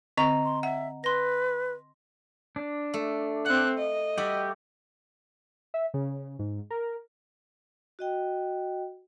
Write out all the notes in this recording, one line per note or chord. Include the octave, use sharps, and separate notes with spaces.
D3 C4 D#5 A#5 C#6
C6
E5 F#5
B4 C6 A#6
D4
A3
C4 F#5 F#6
D#5
G3 F#4 G4 E5
E5
C#3
G#2
A#4
F#4 D#5 G5